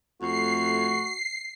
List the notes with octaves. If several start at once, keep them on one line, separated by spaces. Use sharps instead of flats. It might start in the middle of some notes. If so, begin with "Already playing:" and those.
F2 A3 F#4 C7